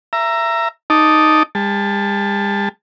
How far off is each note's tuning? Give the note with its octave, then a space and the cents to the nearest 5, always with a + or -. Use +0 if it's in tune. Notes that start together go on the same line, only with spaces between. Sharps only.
E5 +25 A#5 +0
D#4 +0 A5 +0 D6 +0
G3 +45 A5 +0